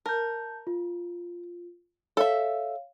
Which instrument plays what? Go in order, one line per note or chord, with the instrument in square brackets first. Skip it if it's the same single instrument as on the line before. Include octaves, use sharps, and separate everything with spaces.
[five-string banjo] A#4 [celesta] A5 G6
[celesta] F4
[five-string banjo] A4 E5 [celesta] C#5 F5